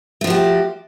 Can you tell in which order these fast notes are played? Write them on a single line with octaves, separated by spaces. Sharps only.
A3 F3 F#4 G4